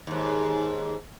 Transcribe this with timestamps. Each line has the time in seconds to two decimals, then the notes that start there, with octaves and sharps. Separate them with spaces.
0.07 D#2 G#2